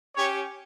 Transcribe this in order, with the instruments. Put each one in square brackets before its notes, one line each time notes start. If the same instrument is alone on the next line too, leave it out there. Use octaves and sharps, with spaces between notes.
[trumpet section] C#4 G4 C#5